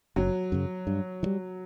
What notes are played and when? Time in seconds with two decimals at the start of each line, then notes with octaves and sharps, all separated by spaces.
0.16 F#1 F#3
0.52 F#2 C#3
0.87 G2
1.23 E3
1.26 G3